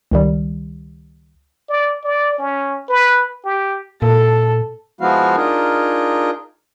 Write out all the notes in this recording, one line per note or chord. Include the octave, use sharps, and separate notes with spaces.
C#2 D#3 G3
D5
D5
C#4
B4
G4
A#2 A4
F3 G#3 B3 E4 F#4 F5
D4 D#4 F4 G#4 A#4